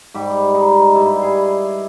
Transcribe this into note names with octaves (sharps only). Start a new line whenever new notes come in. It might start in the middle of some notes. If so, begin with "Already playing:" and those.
G#2 G3 G4
D#4
G2 G3 E4
G#4